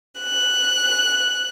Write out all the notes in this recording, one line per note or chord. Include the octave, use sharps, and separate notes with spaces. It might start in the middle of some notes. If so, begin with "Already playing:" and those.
F#6